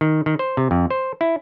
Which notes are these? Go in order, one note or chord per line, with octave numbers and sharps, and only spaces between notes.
D#3
D#3
C5
C3
F2
C5
E4